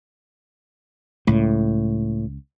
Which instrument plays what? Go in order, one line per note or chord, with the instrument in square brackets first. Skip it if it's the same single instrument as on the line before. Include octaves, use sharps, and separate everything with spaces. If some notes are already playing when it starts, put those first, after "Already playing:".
[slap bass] C#2 [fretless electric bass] A2